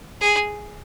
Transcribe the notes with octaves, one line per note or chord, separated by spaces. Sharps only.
G#4